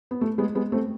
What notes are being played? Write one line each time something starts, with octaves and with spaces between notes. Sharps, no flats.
B3
A3
G#3 B3
G#3 B3
A3 C4